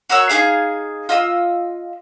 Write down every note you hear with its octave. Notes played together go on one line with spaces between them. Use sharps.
F#4 A#4 C#5 E6
D#4 E4 G#4 F5
F4 D#5 E6